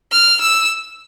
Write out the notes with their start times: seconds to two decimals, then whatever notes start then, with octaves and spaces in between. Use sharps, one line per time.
0.12 F6
0.41 E6